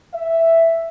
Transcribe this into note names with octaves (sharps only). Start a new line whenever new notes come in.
E5